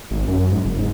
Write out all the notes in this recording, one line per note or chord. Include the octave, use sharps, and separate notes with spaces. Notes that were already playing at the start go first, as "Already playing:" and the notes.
G#1
F#2
G#2
F#1
G#2